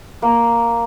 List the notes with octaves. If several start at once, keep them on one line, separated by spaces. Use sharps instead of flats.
A#3